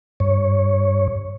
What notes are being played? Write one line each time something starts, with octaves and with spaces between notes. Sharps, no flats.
G2 C#5